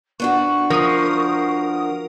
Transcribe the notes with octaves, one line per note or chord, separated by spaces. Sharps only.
B3 D4 F#4 C#6
F3 A#4 D#6